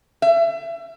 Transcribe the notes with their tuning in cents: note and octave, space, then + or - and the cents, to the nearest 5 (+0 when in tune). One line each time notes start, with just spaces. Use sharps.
E5 +30